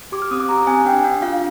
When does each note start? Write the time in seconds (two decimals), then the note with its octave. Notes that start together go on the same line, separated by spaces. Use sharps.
0.12 G4 D6
0.22 F6
0.31 C4 D#6
0.40 D6
0.49 G4 A#5
0.67 C4 G#5
0.85 D4 G5
1.05 D4
1.22 F4 F5